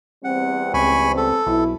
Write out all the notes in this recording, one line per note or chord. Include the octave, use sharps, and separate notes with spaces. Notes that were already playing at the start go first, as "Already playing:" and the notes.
E2 G3 C4 F#5
C#2 G#5 B5 C#6
A4
B1 E4